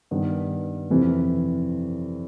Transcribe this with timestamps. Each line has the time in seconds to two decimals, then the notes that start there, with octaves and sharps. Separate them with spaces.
0.11 G2 D#3 G3 B3
0.90 F2 C3 E3